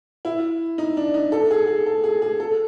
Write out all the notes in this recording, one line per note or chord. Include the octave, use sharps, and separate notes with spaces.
E4
D#4
D4
D#4
A4
G#4
G#4
A4
G#4
G#4
A4